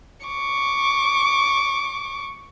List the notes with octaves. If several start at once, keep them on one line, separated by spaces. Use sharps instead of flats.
C#6 D6